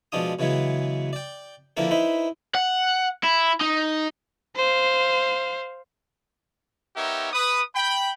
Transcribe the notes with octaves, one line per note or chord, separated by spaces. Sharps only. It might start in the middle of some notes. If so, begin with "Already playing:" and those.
B2 F3 G#3 D4 F4 D#6
C#3 E3 F#3 G#3 B3
D5 G5
D3 F3 A#3 E4 A#4 B4
D#4 E4 B4 C5
F#5
E4
D#4
C5 F5
B3 D#4 G4 A#4 C#5 E5
B4 D#6
G5 B5